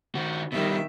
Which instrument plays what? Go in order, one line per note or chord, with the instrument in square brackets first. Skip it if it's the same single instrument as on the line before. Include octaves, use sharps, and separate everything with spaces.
[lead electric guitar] D#3 F#4
[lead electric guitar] B2 G3 [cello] D#3 E5